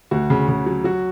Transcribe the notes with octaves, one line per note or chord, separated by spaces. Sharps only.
D2 F#4
C#3
C#3
F#3
F#3 F#4